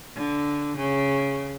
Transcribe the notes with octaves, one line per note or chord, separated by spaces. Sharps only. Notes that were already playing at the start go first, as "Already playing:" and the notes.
D3
C#3